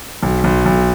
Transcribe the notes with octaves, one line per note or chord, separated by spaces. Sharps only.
B1
B1
B1